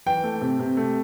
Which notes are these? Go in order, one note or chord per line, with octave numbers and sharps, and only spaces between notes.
E3 G5
A3
C3
C3
A3